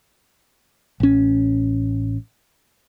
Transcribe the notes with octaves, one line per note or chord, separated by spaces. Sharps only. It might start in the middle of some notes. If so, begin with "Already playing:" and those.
A1 C#4